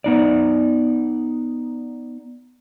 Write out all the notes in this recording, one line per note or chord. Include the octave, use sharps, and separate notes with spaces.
B3 D#4 D5